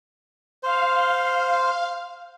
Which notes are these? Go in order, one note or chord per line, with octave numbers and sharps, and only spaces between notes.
C5 F5